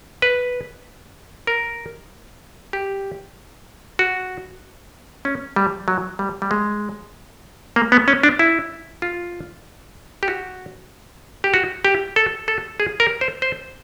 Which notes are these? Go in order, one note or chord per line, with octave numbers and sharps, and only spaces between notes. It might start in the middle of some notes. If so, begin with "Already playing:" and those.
B4
A#4
G4
F#4
C#4
G3
F#3
G3
G3
G#3
A#3
B3
C#4
D4
E4
F4
G4
F#4
G4
F#4
G4
A4
A4
G#4
A#4
C5
C5